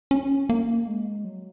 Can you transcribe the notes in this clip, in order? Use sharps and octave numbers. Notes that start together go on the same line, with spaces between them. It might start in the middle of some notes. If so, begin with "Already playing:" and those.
C#4
A#3
G#3
F#3